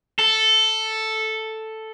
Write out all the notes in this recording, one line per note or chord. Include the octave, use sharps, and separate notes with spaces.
A4